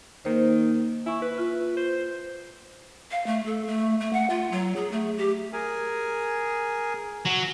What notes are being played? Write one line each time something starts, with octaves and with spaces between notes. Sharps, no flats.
D#3 A#3 C5
E4 G#5 C#6
B4
F4
C5
F5
A3
A4
A3
A3
F#5
F4
F#3
G#4
A3
G4
G#4 A#4 G#5
F#3